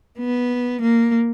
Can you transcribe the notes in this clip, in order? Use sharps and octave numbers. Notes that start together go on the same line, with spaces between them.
B3
A#3